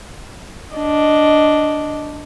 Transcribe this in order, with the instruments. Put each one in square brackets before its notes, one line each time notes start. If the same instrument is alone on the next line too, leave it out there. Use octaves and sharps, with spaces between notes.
[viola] D4 D#5